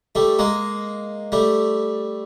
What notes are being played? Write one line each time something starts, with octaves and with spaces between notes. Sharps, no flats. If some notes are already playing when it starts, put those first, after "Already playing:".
G3 A3
G#3 A#3
G3 A3